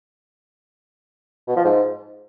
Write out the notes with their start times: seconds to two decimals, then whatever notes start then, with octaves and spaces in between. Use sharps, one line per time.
1.48 B2
1.56 F3
1.65 G#2